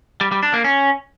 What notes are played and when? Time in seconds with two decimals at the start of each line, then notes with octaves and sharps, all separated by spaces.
0.21 G3
0.32 G3
0.43 D4
0.53 A#3
0.64 C#4